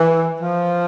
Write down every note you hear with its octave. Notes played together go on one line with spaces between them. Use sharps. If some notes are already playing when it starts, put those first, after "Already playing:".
Already playing: E3
F3